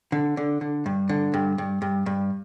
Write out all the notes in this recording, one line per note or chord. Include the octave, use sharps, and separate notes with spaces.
D3
D3
D3
G2
D3
G2
G2
G2
G2